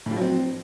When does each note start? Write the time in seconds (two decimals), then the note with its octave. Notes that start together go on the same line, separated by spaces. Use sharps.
0.06 A2
0.11 F3
0.16 F#3
0.21 C4